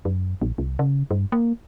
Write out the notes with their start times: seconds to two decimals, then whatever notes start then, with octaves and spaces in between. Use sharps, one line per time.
0.05 F#2
0.42 A#1
0.58 C2
0.79 C#3
1.11 G2
1.32 A#3